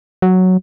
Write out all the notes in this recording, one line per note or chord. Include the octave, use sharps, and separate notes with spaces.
F#3